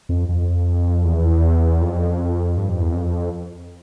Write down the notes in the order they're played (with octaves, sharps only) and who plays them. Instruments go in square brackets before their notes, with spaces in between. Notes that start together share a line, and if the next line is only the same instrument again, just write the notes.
[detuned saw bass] F2
F2
E2
F2
G2
F2
E2
F2